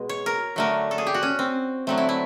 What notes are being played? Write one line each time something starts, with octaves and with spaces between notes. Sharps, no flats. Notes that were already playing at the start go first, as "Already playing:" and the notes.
Already playing: B2 G#3
C#5
A#4
D3 F#3 A3 A#4
A4
G#4
G4
F#4
C#4
C4
D3 F#3 A3 C4
E4
E4